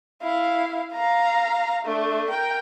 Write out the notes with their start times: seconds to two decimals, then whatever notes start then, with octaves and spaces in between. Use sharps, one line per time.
0.22 E4 F5
0.93 F5 A#5
1.85 A3 D4
2.29 A#4 G5